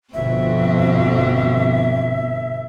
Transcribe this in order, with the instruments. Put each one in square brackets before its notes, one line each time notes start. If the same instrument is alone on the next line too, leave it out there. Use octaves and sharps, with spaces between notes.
[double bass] G1 B2 [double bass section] F2 [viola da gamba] C4 F#4 [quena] E5